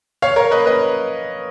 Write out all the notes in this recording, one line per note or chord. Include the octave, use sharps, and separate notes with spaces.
C#5 F5
A#4 C#5
B4 D#5
B4 D#5